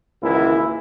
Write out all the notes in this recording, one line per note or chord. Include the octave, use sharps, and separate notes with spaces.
G#1 C#2 E3 A#3 E4